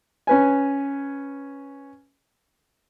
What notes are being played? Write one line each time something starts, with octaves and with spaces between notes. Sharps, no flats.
C#4 B4 G#5